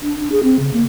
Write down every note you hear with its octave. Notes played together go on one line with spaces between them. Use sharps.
D4
D4
G#4
C4
C#3
A#3